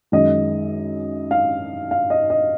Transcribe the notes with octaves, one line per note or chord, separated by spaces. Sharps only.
F#2 D#3 G#3 D#5
F5
F5
D#5
D#5